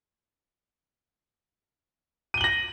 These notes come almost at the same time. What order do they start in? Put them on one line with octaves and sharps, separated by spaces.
D#7 G7 F#7 A#6